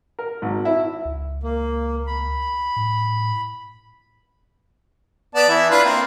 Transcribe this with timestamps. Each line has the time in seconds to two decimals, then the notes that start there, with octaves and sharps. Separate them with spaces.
0.19 A#4
0.42 G#1
0.65 E4
1.05 C#2
1.43 A#3
2.07 B5
2.77 A2
5.35 B3 D5 A5
5.49 E3 E4
5.70 D4 F4 B4
5.84 A#3 C4